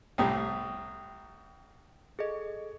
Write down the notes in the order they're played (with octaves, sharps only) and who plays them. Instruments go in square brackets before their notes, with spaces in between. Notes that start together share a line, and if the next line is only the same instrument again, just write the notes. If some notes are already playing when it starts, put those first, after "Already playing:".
[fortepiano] C2 A2 G4 [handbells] G5 A#5 D#6
[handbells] G#4 A4 D#5